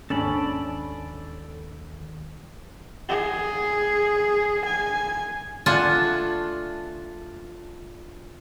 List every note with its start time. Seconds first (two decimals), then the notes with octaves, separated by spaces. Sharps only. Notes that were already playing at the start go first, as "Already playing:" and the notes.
0.10 D#2 G#2 C#4 D4 A4 D5 B5
3.09 G#4
4.65 G#5
5.66 A3 D4 F4 F#5 G#5 A5